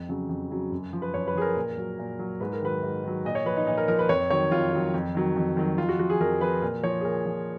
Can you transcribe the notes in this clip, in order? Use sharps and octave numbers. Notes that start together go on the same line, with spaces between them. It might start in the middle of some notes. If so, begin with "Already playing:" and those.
Already playing: F2
C#3 F#3
F2
C#3 F#3
F#2
F3
B4
F#2 C#5
B4
F3 G#4
A#4
A#2
F#3
A#2
F#3
G#2 B4
A#4
D#3 F#3 B4
G#2
D#3 F#3
A#2 D#5
C#5
F3 B4
D#4
A#2 D#4
A#4
F3 A#4
B4
F2 C#5
D#3 F#3 C#5
F2 F4
D#3 F#3
F2
D#3 F#3
F2
D#3 F#3
F2 F4
F#4
F3 F#4
G#4
F2 A#4
F3 B4
A#2 A#4
F3 C#5
G#4
A#2 A#4
F3